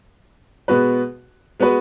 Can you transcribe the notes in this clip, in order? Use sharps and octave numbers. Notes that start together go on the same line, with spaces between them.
B2 G#3 B3 F#4 B4
G#3 B3 F#4 B4